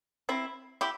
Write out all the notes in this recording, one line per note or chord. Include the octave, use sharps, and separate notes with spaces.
C4 E4
E4 G4